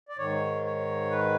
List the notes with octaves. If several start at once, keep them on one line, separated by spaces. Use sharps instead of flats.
D5
G#2 D#3 C#5
C#5
B4